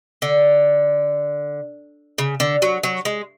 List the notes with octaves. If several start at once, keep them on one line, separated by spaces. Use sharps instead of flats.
D3
C#3
D3
F#3
F#3
G#3